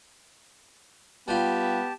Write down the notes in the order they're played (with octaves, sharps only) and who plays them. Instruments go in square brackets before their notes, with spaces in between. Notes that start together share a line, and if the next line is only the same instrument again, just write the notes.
[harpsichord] G3 F4 [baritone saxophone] B3 [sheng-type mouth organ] G4 A5